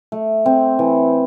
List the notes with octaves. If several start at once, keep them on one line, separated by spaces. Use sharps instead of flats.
A3
C4
E3